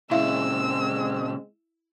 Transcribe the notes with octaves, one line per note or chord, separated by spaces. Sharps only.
A#2 C#3 G#3 C4 E4 E5 F5 E6